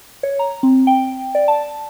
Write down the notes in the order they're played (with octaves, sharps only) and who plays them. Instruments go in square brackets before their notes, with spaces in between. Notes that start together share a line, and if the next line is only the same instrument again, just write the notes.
[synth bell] C#5
A#5
C4
G5
D5
A5